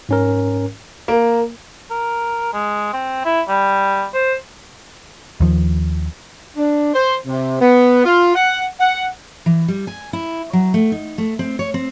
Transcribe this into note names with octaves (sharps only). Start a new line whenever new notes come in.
G#2 C#4 A#4
A#3
A#4
G#3
C4
E4
G3
C5
D#2 F3
D4
C5
C3
B3
F4
F#5
F#5
E3
G3
G#5
E4
F#3
A3
D#4
A3
C4
C#5
C4